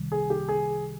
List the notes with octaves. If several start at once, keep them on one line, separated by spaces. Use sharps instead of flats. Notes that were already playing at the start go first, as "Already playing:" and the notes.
Already playing: C2 C3 D#3 G3
G#4
G4
G#4